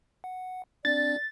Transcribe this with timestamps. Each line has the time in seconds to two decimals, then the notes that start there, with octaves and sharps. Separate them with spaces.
0.24 F#5
0.85 C4 D4 D5 A6